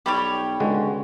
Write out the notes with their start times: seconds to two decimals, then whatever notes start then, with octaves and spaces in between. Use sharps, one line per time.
0.06 B1 G3 G4 C#5 B5
0.60 C#2 D3 G#3 F#4